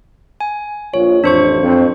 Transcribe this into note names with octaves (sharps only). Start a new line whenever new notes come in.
G#5
A#1 F4 C#5
A1 F2 D4 C5 C#6
F2